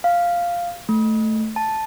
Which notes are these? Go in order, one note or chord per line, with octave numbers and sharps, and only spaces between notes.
F5
A3
A5